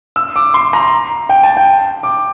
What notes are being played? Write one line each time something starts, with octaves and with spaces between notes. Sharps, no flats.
E6
D6
C6
A#5
G5
A5
G5
D6